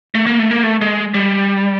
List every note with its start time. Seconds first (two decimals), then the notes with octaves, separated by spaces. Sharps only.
0.15 A3
0.26 A#3
0.39 A3
0.51 A#3
0.63 A3
0.81 G#3
1.14 G3